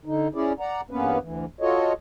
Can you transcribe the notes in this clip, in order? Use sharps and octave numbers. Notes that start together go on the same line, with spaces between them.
D3 D#4
C#4 E4 G#4 D5
D5 F#5 A#5
E2 G2 A#3 B3 C#4 B4
D2 E3
F4 F#4 A4 C#5 D#5